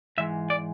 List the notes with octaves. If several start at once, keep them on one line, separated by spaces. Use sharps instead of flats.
G#2 E3 G#3 E5
D5